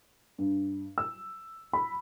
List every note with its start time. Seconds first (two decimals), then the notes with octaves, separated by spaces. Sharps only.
0.38 G2
0.98 E6
1.73 B5